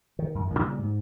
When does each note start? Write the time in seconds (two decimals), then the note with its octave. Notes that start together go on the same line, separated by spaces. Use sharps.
0.19 D#3
0.35 F#2
0.48 A1 D#3
0.59 A#2 C#3 G3
0.79 G#2